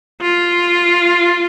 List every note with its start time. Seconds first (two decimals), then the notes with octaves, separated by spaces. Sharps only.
0.22 F4